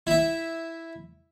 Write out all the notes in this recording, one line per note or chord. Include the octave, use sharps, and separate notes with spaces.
E4 E5